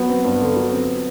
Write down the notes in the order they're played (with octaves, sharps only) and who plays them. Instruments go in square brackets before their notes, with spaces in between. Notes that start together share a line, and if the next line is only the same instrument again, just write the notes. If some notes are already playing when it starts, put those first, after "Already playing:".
Already playing: [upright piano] F#3 [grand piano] B3
[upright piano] C4
G2
D3
F#3
C4